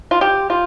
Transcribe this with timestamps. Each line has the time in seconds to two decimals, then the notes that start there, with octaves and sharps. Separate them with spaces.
0.11 F4
0.21 G4
0.50 F4